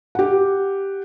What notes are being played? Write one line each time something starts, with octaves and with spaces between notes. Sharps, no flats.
G4 F#5